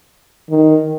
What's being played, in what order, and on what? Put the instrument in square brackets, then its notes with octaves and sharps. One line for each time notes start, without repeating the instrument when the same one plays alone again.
[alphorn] D#3